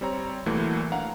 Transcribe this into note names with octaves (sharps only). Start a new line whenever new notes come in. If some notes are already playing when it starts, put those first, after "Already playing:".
G3 C4 C#5 A#5
C2 E3 F#3 A3 A#3
D4 F5 F#5 A#5